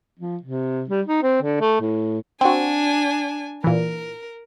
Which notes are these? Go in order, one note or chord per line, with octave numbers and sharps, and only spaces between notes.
F3
C3
G3
D#4
C4
D3
A3
A2
C4 D4 F#4 G#5
A#2 E3 A#4